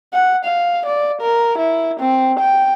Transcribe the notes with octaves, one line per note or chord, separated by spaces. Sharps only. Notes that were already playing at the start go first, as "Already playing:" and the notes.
F#5
F5
D5
A#4
E4
C4
G5